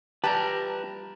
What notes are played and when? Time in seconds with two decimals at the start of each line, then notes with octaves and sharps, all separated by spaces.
0.24 E3 F3 G3 G4 B4 A5 A#5